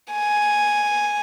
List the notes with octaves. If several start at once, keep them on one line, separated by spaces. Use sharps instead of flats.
G#5